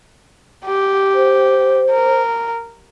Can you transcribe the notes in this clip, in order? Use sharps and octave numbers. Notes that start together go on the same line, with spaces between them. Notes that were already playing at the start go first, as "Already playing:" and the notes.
G4
C5
A#4